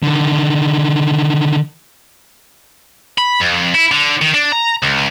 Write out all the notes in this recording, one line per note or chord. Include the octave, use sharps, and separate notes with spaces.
D3 D#3
B5
F2
E4
D3
D#3
D4
A#5
C#2